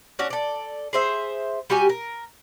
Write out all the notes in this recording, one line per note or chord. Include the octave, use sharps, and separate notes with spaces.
C#4 D4 F#4
A4 D5
G#4 C5 E5
G3 F#4 G4 G#5
A#4